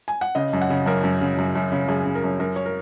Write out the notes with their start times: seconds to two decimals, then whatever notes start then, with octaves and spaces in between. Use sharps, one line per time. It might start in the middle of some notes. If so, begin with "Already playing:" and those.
0.08 G#5
0.21 F#5
0.35 C#3 D#5
0.53 F#2
0.62 F#5
0.70 C#3
0.86 F#2 A#4
1.04 F#2
1.21 C#3
1.38 F#2
1.55 F#2
1.72 C#3
1.88 F#2 G#4
2.06 C#3
2.15 A#4
2.24 F#2
2.40 F#2 A#4
2.56 C#5
2.66 A#4